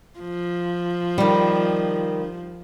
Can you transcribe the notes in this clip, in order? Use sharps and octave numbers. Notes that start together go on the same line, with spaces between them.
F3
D#3 G3